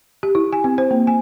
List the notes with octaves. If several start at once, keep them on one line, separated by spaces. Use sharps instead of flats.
G4
E4
G#5
C4
C5
A#3
G#5